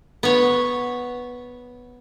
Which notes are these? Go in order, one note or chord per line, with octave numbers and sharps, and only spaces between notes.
B3 C#5